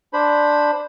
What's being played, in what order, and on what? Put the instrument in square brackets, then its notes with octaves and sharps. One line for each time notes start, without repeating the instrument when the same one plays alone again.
[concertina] D4 C5 B5